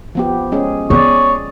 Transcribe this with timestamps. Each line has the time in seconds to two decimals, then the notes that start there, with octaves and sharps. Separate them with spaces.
0.15 F3 B3 G4
0.52 G#3 C#4 G#4
0.90 B3 G#4 C#5 D5